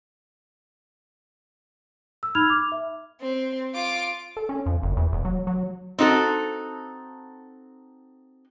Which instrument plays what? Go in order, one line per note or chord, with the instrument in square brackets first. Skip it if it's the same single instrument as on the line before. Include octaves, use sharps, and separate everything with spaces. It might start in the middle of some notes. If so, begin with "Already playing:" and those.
[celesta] E6
D#4 B5 F6 G#6 F7
D6
E5
[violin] C4
F4 D6
[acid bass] A4
C#4
F2
F#1
E2
E1
F#3
F#3
[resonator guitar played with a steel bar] C4 D#4 F#4 A4